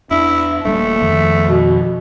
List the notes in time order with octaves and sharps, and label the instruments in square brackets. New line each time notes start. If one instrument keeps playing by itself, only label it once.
[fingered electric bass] E2 D4 [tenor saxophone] E4
[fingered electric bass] D#1 G3 A#3 [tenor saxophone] A3
[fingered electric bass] F2 D#3 F3
[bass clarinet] B2